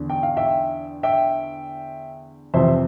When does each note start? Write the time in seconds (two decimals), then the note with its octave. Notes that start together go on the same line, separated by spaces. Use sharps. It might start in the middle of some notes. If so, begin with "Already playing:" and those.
Already playing: E2 D3
0.10 G5
0.23 F5
0.37 E5 G5
1.03 E5 G5
2.54 F2 C3 E3 C5 E5